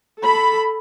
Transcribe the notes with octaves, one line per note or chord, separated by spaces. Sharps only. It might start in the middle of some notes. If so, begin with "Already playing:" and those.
A4 B5